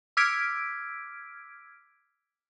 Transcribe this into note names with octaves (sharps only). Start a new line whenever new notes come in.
D6 E6 F6 G#6 B6 D7